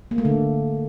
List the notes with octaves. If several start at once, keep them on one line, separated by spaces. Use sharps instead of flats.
A#3
A3
D3